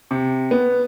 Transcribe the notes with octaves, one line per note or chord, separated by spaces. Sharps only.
C3
B3